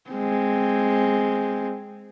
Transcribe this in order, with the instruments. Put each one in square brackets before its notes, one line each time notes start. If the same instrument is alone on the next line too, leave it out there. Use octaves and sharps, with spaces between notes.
[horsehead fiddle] G#3 C4